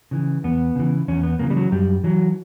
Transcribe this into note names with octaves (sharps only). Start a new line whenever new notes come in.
C#3 E3
E2 B3
C#3 E3
E2 C#4
B3
C#3 E3 A#3
G3
F#3
F#2 G3
E3 F#3